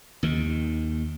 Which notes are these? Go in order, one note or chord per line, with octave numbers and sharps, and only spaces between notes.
D#2 D#3